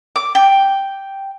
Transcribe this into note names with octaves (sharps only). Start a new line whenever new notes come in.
D6
G5